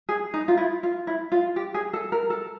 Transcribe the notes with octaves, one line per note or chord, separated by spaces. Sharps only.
G#4
D#4
F4
E4
F4
E4
F4
G4
G#4
A4
A#4
A4